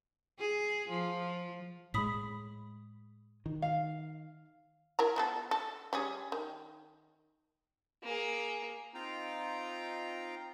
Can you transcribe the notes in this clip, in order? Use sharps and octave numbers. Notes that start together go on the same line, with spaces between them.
G#4
F3
A2 G#3 B5 D#6 B6
D#3
F5
E4 A#4 A#5
F3 B3 A4
A4
G3 C#4 G#4
D#3
A#3 G#4
C4 D#4 F4 F5 G5 A#5